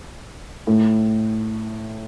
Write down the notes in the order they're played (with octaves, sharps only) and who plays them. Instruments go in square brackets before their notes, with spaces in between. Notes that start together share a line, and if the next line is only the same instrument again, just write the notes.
[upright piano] A2